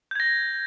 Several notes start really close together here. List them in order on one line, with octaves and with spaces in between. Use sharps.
G6 G#6 A#6